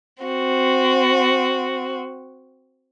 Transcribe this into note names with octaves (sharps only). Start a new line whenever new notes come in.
C4 F#4